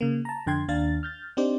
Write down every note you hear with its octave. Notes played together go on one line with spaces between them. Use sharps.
C#3 A#3
A5 A#5
F2 D3 G5 C6 G#6
D#2 D4 F5 A6
F6 G6 A6
C4 D4 D#4 G4 C5 D5